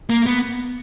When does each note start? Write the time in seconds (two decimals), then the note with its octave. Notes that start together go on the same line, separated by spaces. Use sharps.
0.10 A#3
0.26 B3